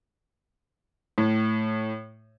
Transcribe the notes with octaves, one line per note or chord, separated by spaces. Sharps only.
A2